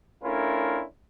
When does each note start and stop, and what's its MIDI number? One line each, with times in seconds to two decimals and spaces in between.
0.24 0.82 57
0.24 0.82 61
0.24 0.82 62
0.24 0.82 64
0.24 0.82 65
0.24 0.82 70